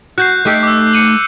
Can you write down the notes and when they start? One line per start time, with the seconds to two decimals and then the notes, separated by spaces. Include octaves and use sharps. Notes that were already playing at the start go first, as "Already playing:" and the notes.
0.18 F#4 F#6 G6 C7
0.45 A3 D#4 G4
0.63 D6 E6
0.93 C#7 D#7 F#7